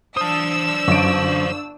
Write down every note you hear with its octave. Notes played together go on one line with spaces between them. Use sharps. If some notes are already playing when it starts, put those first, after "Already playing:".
D4 C5 A5 D#6 E6
G1 F#2 D7